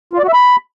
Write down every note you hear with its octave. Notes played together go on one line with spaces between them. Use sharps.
F4
D5
F#4
E5
B5